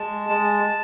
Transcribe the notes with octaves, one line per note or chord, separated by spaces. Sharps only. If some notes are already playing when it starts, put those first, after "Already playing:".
Already playing: G#3 A5
G#3